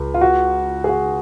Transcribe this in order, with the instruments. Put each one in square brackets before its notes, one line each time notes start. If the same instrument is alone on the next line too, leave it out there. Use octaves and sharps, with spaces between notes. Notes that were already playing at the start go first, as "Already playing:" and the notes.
Already playing: [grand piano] C#2
[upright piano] F4
F#4
G#4
F#4